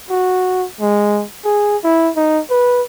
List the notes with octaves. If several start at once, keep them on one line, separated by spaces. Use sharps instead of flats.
F#4
G#3
G#4
E4
D#4
B4